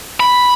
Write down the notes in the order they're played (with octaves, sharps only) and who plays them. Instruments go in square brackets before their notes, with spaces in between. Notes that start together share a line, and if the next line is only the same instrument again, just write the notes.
[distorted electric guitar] B5